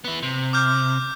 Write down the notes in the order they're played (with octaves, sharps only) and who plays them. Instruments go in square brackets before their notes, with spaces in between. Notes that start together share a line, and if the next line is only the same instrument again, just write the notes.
[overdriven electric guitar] B3 E4
C3
[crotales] D6 F6 G6